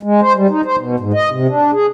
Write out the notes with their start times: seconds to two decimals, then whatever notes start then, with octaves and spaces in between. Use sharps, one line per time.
0.03 G#3
0.22 C5
0.35 G3
0.50 D#4
0.65 C5
0.78 B2
1.00 G#2
1.14 D#5
1.31 C3
1.48 D4
1.73 G#4